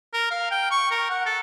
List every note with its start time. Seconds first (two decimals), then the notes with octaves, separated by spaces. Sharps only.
0.13 A#4
0.30 F5
0.51 G5
0.71 C#6
0.91 A#4
1.10 F#5
1.26 A4